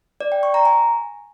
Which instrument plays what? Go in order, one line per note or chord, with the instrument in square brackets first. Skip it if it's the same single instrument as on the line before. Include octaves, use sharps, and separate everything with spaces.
[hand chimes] D5
G5
C#6
A#5
G#5